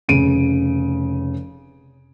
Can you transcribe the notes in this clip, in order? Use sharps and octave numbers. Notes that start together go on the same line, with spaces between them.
F1 C#3 D7 D#7